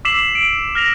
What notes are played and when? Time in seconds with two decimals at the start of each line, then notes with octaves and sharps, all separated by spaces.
0.05 D6 E6 B6 C7 E7 F#7
0.35 D7
0.75 F6 A#6 F7